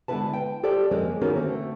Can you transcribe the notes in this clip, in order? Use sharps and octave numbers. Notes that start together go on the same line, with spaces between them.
D3 G#3 B3 E4 B4 A5
G5
G4 A4 C5 D5 G5
F2 G#3 A#3 C4 C#4
D#3 A#3 B3 C#4 F#4 A#4
D3 A3 C4